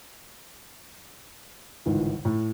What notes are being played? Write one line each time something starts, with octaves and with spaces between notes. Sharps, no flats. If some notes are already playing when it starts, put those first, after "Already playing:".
G1 C#2 G#2 D#3 E3
A2